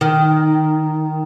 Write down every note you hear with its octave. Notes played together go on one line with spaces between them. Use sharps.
D#3